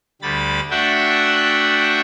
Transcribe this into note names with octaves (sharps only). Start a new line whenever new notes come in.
D2 D3 G3 B5 A6
A3 D4 F#4 E5 F#5 G5